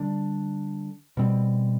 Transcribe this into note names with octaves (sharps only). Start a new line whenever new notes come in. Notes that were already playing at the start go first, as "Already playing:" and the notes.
Already playing: D3 G3 D4
B2 G3 C4